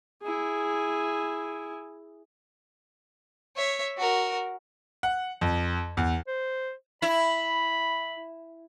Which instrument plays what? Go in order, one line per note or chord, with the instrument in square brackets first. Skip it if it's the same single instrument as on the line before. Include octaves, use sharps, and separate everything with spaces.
[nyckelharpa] E4 G#4
[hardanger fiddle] C#5 E5
F#4 A#4
[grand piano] F#5
F2
E2
[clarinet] C5
[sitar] E4 [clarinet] B5